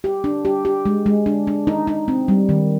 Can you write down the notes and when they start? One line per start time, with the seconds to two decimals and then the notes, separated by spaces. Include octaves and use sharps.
0.04 G4
0.24 D4
0.45 G4
0.65 G4
0.86 G#3
1.06 G#3
1.26 D4
1.47 D4
1.67 D#4
1.87 D#4
2.08 C4
2.28 G3
2.49 D#3